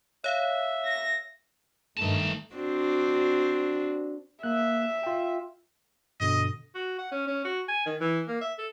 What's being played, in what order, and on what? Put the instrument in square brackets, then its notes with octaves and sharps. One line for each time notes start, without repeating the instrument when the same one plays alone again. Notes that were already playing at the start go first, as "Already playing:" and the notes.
[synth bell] C#5 F5 [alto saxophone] E5
[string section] A#6
[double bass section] G2 D#3 A3 [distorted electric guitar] D#4 A5
[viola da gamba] C4 D4 F#4
[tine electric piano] A#3 F#6 [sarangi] E5
[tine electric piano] F4 G5
[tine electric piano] G2 B2 D3 [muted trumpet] D#5
[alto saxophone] F#4
F#5
C#4
C#4
F#4
G#5
D#3
E3
A#3
E5
A4